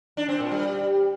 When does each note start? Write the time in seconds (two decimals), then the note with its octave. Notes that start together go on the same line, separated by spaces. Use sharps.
0.17 D4
0.29 C4
0.40 A#2
0.52 G3